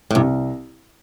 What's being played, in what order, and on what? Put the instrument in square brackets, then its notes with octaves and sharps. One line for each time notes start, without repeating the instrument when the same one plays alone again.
[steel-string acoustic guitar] A2
[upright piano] C2 [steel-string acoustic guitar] G2